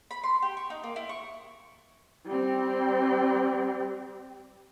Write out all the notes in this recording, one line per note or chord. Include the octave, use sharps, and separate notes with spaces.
B5
C6
G4
C#6
D#4
A#3
E4
C#6
G3 C4